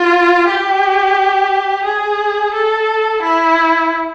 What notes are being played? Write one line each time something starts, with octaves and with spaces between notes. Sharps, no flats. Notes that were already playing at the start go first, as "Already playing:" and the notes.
Already playing: F4
G4
G#4
A4
E4